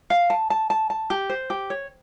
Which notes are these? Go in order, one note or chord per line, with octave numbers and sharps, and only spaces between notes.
F5
A5
A5
A5
A5
G4
C5
G4
C#5